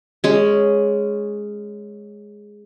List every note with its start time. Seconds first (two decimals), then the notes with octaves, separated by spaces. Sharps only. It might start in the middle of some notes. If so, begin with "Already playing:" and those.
0.24 G#3 C#4